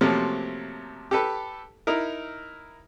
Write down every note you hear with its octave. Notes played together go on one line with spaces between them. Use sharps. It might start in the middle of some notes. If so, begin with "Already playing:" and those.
C3 F3 F#3 A3 A#3 C#4
G4 A4 B4
D#4 E4 A#4